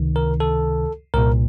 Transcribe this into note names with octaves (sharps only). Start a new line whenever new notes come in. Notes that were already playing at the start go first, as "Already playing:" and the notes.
Already playing: C#2 C3 D#3
A#4
A4
C2 A#2 A#4